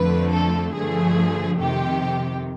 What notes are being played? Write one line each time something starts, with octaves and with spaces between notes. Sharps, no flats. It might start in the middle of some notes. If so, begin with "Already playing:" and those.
Already playing: F2 D3 F3 A3 B4
A4
G2 D3 F3 A3 G#4
F2 C3 D#3 G4